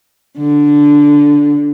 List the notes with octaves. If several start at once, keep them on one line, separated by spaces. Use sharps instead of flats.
D3